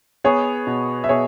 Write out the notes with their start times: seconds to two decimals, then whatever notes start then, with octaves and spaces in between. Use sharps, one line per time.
0.24 B3 G#4 C#5
0.67 B2
1.04 E5
1.09 B2 G#4 C#5